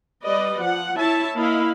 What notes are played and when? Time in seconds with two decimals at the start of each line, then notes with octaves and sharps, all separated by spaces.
0.23 G3 B4 D5 D#5
0.63 F3 F#5
0.98 E4 C#5 E5 A5
1.36 A#3 E4 D#5 F5 B5